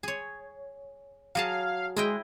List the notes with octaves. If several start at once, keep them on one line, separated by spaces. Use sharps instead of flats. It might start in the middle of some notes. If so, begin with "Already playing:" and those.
G#4 C#5
F#3 G#4 F5 A5
G#3 E4 D#5 G5